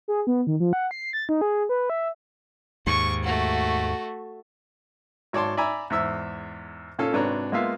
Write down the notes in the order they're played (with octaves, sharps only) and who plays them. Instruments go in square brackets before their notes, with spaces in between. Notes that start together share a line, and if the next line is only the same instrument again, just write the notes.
[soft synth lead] G#4
B3
D#3
F3
F#5
C7
A6
D#4
G#4
B4
E5
[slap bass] D#2 G#2 [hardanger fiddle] C#6
[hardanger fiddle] A3 F#4
[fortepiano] G#1 C#5 D5 A5 C6
D5 E5 G#5 A#5 B5
E2 G#2 E5 E6
A#2 C#4 A4 F5
G#1 C3 D4 B4 C#5 A#5
G#3 A#3 B3 F4 E5 F5